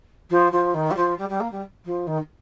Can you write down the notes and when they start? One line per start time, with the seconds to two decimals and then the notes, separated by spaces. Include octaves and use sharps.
0.30 F3
0.52 F3
0.74 D#3
0.91 G3
0.96 F3
1.18 G3
1.29 G3
1.40 A#3
1.51 G3
1.85 F3
2.07 D#3